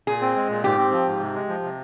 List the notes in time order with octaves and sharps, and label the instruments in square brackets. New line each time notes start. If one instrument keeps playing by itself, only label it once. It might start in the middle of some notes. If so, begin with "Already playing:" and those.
[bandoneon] A#2 [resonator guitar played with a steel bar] G#4
[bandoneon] C4
G#3
A#2
[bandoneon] G#2 [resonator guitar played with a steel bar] G4
[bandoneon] C4
F3
G#2
C3
G#3
F3
C3